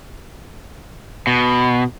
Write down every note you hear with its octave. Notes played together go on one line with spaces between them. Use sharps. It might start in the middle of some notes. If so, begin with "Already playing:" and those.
B2